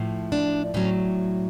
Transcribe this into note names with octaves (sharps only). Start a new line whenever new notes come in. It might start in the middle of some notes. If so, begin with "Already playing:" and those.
Already playing: A2 F3
D4
A2 F#3 C#4